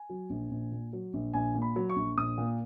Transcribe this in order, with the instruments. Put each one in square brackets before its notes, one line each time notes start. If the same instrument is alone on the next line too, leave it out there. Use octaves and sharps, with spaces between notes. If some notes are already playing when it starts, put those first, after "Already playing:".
Already playing: [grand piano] G#5
F#3
A#1
A#1
A#2
F#3
A#1
A#1 G#5
A#2
B5
F#3
C#6
A#1
A#1 D#6
A#2